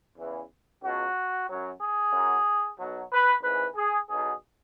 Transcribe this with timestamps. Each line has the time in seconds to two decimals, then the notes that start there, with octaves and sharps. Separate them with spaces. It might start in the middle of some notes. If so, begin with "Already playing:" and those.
0.17 E2 C#3 E3
0.82 C#2 B2 F#3 F#4
1.47 F#2 F#3
1.80 G#4
2.12 F#2 F#3
2.78 B1 B2 F#3
3.11 B4
3.43 G#1 G#2 E3 B4
3.75 G#4
4.09 B1 B2 F#3 G#4